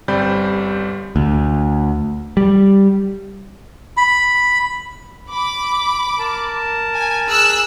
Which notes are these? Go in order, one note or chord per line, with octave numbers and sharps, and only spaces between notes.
G1 G3 C4 D5 B5 G6
D2
G3
B5
B5 D6
A#4 A5
G#5
G#4 E6 F#6